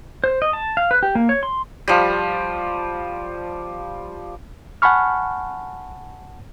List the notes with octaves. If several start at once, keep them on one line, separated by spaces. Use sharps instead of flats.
C5
D#5
A5
F5
B4
G4
A#3
C#5
C6
F3 G3
F#5 G#5 A5 B5 C#6 F6